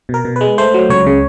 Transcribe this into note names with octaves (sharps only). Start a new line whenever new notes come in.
B2 A#4
B2
G#3 B4
A3 C5
F#3
C#2 C#5
C#3